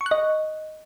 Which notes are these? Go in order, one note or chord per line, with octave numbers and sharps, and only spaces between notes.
C#6
F#6
D#5